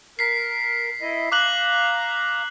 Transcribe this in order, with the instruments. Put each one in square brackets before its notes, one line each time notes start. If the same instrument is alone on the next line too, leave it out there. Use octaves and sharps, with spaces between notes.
[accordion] A#4 [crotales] B6 C7
[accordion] E4 D#5
[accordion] F5 A#5 [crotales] D6 F#6 F#7